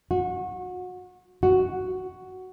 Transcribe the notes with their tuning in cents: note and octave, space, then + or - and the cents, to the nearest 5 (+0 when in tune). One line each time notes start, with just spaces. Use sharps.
F#4 -25
F#4 +5